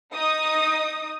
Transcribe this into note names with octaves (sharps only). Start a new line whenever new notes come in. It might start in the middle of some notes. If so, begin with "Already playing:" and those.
D#4 D#6